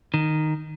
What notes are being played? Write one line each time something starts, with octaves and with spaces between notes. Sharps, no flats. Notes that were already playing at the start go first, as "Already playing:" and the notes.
D#3